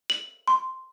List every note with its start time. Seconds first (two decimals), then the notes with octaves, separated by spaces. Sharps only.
0.10 F#7
0.48 C6